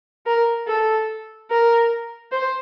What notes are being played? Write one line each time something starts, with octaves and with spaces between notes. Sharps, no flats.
A#4
A4
A#4
C5